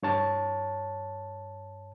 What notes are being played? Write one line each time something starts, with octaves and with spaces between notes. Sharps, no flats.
G2 C#5 A5